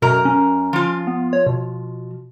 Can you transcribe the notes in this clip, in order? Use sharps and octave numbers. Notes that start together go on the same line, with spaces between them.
F#2 B2 A#4 A#5
C#4
F3 F4
B3
C#5
B2